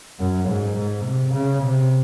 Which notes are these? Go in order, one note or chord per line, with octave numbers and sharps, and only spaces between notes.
F#2
G#2
G#2
C3
C#3
C3